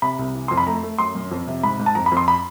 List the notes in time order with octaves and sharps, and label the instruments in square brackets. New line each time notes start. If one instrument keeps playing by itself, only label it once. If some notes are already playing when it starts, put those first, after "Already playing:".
[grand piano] C3 B5
C2
E3
F2 C6
B5
A3 A#5
A3
F#2 C6
F#2
F2
C3
G#2 B5
G#2
A5
F2 A#5
B5
F2
C6
B5